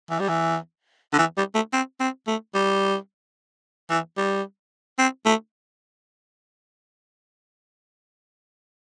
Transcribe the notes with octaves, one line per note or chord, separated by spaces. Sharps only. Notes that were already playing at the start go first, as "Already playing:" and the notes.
E3
G3
E3
D3
E3
G3
A3
C4
C4
A3
G3
E3
G3
C4
A3